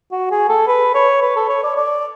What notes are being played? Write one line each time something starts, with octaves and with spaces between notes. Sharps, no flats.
F#4
G#4
A4
B4
C#5
B4
A4
C#5
D5
D5